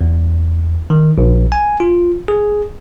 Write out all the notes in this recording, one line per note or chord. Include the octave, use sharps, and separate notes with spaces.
E2
D#3
A#1
G#5
F4
G#4